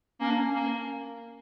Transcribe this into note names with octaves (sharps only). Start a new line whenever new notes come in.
A#3 C#4
D4
C#4
A#3